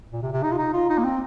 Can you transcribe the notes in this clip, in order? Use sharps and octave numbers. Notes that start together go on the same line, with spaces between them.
A#2
C3
C3
D#4
F4
D#4
F4
D#4
A#3
C4